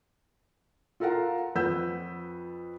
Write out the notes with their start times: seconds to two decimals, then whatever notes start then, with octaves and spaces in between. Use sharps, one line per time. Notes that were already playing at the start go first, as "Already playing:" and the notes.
1.00 F4 A4 A#4 F5 F#5 A#5
1.55 F2 B4 F#5 E6 G6